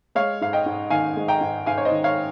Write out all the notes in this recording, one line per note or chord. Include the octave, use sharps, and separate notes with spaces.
G#3 C#5 F5
G#2 F5
D#5 G5
G#2
D#3 F5 G#5
G#3
G5 A#5
G#2
G#2 F5 G#5
C#5
C5 D#5
D#3
C#5 F5